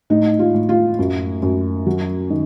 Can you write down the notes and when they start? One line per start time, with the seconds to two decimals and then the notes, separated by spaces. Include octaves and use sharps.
0.10 A2 D#4
0.39 F4
0.54 A2
0.69 F4
0.99 F#2
1.42 F#2
1.86 F#3
2.30 D#3